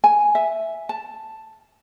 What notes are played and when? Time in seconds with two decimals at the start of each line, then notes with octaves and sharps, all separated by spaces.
0.04 G#5
0.35 E5
0.89 A5